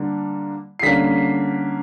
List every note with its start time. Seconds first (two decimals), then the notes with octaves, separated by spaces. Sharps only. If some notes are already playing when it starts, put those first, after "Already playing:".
Already playing: D3 G3 A#3 D4
0.79 C7
0.83 D3 G3 A#3 C#4 B6